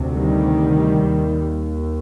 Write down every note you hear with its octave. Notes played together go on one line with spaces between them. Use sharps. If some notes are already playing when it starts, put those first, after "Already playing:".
Already playing: D2 C3
D#3 G3
D#2